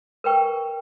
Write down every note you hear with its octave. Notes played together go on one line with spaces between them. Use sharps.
A#4 B4 G5 C#6